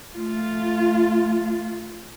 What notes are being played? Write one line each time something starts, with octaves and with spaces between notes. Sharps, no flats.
A3 F4